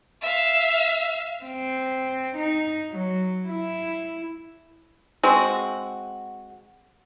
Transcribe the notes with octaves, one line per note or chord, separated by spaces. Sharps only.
E5 F5
C4
D#4
F#3
E4
G#3 C4 F#4